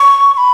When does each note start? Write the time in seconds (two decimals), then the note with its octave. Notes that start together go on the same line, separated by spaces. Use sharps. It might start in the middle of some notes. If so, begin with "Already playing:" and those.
Already playing: C#6
0.34 C#6
0.37 B5